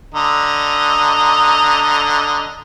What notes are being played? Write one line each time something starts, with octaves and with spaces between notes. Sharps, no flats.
D3 D#5 A#5